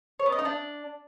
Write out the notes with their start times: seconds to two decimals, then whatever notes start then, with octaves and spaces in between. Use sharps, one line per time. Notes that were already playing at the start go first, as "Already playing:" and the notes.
0.20 C#5
0.26 B3
0.32 D#5
0.39 D#4
0.45 D4